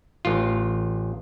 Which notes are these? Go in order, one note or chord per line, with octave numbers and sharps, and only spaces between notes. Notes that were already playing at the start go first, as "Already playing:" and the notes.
A1 F4